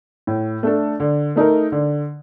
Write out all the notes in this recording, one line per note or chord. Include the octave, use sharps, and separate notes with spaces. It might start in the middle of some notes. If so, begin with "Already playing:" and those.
A2
A3 D4 A4
D3
A3 D#4 A#4
D3